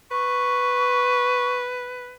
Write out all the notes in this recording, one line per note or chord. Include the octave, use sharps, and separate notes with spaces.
B4 C#6